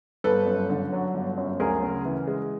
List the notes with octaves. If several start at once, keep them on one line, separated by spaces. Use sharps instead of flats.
G1 A4 B4
F#2
D3
F#3
G1
F#2
D2 G#4 A#4
C#3
E3
G#3